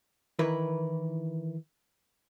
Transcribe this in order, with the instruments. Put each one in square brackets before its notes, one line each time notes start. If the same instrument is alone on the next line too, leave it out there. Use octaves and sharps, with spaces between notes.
[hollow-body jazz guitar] D#3 E3 E4 A#4 B4